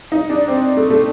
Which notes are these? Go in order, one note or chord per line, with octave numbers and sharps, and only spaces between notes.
D#4
D4
C4
A3
A3